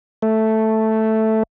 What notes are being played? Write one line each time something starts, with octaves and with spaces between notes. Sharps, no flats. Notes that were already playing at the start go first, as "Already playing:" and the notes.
A3